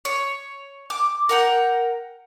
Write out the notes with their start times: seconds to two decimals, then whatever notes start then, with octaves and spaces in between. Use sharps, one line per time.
0.05 C#5
0.90 D6
1.29 A#4 F#5 G5